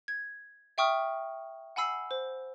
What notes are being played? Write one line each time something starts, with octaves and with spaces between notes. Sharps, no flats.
G#6
E5 G5 C#6 D#6 F6
F#5 G#5 B5 E6 C7
C5